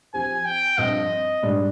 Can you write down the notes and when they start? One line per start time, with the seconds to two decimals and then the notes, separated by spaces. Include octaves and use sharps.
0.14 F3 C4 G4 C5 G#5
0.45 G5
0.78 G2 F3 C4 D#5
1.43 G#2 G3 D4